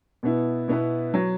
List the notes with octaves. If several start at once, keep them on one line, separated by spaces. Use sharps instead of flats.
B2 B3 E4
B2 B3 E4 B4
F#3